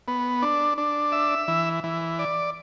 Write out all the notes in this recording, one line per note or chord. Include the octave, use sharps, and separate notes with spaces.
B3
D4
D4
E5
E3
E3
D5